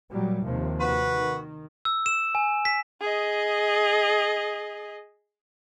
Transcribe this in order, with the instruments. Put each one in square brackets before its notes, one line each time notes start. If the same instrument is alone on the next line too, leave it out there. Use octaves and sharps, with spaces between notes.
[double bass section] A#2 F#3 G3
D#2 C3 F3
[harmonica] F#4 B4
[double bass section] D#3
[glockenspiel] E6
E7
G#5
B6
[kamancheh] G#4 D#5